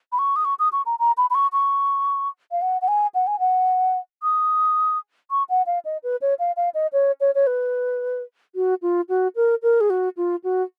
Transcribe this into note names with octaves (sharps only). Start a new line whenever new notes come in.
B5
C#6
D#6
C#6
D#6
C#6
A#5
A#5
B5
B5
C#6
C#6
F5
F#5
F#5
G#5
F#5
G#5
F#5
D#6
C#6
F#5
F5
D#5
B4
C#5
F5
F5
D#5
C#5
C#5
C#5
B4
F#4
F4
F#4
A#4
A#4
G#4
F#4
F4
F#4